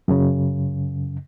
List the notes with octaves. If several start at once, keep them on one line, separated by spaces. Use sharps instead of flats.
F#2 C#3